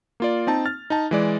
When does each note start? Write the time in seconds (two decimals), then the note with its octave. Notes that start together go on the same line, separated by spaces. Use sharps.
0.20 A#3 F4 D5
0.47 C4 D#4 A5
0.66 F6 A6
0.90 D#4 A5
1.11 E3 G#3 D5